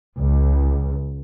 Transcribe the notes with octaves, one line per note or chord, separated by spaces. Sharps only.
C#2